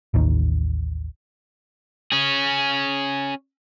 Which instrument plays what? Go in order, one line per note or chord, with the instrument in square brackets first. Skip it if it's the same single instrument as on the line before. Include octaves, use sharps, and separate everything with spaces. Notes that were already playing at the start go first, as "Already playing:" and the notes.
[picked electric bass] A1 D#2 D#3
[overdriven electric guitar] C#4 G#4